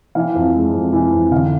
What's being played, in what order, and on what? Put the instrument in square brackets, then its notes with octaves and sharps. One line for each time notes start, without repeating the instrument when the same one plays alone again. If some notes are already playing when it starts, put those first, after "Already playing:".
[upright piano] E3 F5
F2
G#3
F2
E3
F2
D3 F5